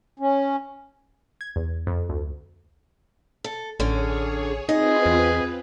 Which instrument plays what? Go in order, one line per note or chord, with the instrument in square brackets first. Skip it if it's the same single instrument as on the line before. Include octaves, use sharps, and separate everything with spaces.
[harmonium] C#4
[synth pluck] G#6
E2
F2
D2
[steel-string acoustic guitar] A4
[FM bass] A1 [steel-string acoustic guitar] D3 C#4 [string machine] G#4 C#5
[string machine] C4 F4 B4 [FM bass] D#4 [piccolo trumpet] G#4 [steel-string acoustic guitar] D#5
[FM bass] E2